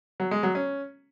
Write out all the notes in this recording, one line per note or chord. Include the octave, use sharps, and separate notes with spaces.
F#3
G#3
F#3
C#4